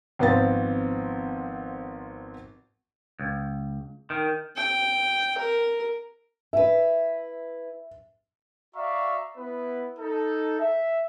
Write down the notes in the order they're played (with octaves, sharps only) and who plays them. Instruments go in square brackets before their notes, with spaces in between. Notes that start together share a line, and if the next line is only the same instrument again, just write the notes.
[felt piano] G#1 F3 B3 C4 A6
[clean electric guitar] C#2
D#3
[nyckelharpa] G5
A#4
[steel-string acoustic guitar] E4 B4 [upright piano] E5
[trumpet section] F#4 D5 E5 F5 A#5 C#6
B3 E4 B4
D#4 A4
E5